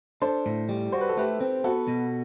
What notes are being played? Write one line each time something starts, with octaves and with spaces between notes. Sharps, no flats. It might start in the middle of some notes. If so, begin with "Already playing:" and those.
D4 A4 C5
A2
G3
F#4 C5
B4
A4
A3 G4 B4
C4
B3 F#4 A4
B2